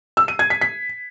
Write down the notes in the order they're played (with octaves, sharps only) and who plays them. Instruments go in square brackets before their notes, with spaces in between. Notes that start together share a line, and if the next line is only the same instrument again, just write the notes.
[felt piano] E6
D#7
G#6
B6
B6